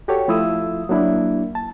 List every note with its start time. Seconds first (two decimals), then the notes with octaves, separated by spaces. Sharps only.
0.08 F#4 G4 A4 C#5
0.28 F3 A3 E4 F4 D#6 E6
0.89 F#3 A#3 D4 E4
1.55 A5